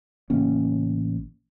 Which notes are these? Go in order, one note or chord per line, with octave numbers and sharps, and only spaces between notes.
A1 C#3 A#3 C#4